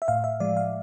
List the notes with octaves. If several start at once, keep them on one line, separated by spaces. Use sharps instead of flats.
E5
A2 F5
E5
F3 G#3 D5
F5